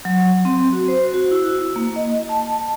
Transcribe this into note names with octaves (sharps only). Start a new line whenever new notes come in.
F#3
C4
F#4
C5
F#4
E4
A#3
D#5
A5